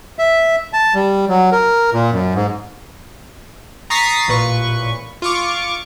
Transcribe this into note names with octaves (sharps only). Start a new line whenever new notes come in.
E5
A5
G3
F#3
A#4
A#2
F#2
G#2
A#5 C#6 D#6 A6 B6 C7
A1 A#2 B4 C#6
F4 C#6 D6